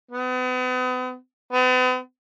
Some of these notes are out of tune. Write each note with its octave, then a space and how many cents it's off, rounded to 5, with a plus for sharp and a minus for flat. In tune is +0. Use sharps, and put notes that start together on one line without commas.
B3 +40
B3 +45